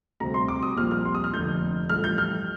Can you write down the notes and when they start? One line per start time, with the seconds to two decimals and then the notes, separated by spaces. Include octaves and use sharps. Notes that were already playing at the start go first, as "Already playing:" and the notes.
0.20 D2 C3 G3 C4 A#5
0.34 C6
0.48 D6
0.63 D#6
0.76 A#1 A#2 G3 C4 F6
0.91 F6
1.05 C6
1.15 D#6
1.24 F6
1.33 F1 F2 D3 G6
1.89 A1 G2 F3 A3 F6
2.04 G6
2.18 F6